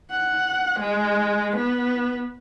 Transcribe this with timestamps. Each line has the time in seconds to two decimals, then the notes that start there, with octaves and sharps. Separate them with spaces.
0.12 F#5
0.79 G#3
1.56 B3